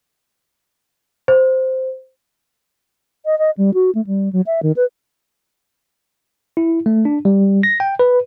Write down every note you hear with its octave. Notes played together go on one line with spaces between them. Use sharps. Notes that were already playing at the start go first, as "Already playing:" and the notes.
C5
D#5
D#5
G3
F#4
A3
G3
F#3
E5
D#3
B4
E4
A3
D4
G3
A#6
G5
B4